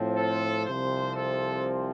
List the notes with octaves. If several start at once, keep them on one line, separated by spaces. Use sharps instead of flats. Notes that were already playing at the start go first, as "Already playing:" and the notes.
Already playing: A2 F3 C4
A4
C2 C3 F3 C4 C5
A4